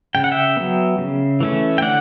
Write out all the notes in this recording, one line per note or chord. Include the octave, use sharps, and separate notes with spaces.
C#3 G5
F#5
E5 G5
F#3 B3
C#3
E3 A3 C#4
G5
D3 D5 F#5